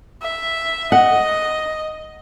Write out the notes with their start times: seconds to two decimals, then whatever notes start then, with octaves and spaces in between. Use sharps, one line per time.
0.22 E5
0.92 D#5 F#5